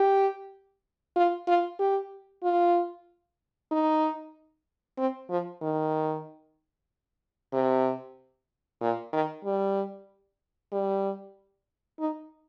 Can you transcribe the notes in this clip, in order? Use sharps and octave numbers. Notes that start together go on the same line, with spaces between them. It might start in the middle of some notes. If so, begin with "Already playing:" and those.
Already playing: G4
F4
F4
G4
F4
D#4
C4
F3
D#3
C3
A#2
D#3
G3
G3
D#4